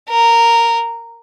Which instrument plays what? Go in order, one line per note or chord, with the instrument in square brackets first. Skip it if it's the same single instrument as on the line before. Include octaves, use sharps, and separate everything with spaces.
[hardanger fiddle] A#4